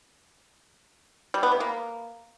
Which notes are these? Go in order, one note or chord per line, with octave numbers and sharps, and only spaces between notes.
G3
B3
C3
A#3